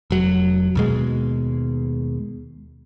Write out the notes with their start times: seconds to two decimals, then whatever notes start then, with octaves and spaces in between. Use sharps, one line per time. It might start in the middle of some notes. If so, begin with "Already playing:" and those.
0.10 F1 F#3
0.75 D#2 B2 G#3